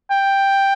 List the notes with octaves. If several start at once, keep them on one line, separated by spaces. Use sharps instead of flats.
G5